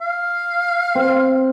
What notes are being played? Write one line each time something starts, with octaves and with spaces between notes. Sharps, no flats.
F5
C4